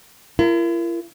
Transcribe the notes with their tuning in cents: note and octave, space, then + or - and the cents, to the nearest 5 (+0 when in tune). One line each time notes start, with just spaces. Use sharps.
E4 +45 A#4 +0